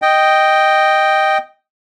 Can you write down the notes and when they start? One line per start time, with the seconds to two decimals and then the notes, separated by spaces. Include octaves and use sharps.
0.02 D#5 G5